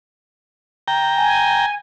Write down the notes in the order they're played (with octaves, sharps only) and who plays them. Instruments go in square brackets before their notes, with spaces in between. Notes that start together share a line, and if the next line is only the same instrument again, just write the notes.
[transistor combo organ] G5 A#5
[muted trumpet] G#5